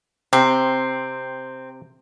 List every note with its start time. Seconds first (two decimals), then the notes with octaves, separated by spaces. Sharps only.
0.33 C3 C4